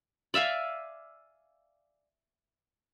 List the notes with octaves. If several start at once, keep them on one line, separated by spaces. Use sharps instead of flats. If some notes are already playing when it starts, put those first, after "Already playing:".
D5 E5 F5 G#5